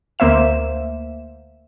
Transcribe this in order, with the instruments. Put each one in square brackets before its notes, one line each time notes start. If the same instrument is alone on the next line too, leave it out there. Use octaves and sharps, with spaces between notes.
[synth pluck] D2 A#3 C5 E5 E7